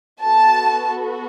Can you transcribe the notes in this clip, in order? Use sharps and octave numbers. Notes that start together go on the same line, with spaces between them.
B3 F#4 A4 A5